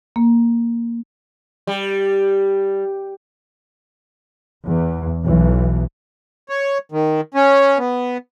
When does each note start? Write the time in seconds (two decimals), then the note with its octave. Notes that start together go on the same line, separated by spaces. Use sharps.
0.16 A#3
1.67 G3
4.65 E2
5.24 B1 E3
6.49 C#5
6.92 D#3
7.34 C#4
7.78 B3